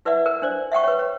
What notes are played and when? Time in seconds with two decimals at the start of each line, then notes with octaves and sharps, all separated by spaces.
0.05 E4 B4 D5 E5 F#5
0.26 A#4
0.42 D4 C5 D5
0.72 E5 F#5 G5 C#6
0.84 B4 C#5
0.99 C#5